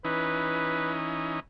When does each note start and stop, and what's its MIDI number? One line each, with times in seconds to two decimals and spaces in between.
0.05 1.40 52
0.05 1.40 61
0.05 1.40 63
0.05 0.95 71